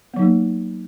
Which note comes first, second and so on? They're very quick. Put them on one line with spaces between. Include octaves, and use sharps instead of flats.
B3 F#3 D#4 A#3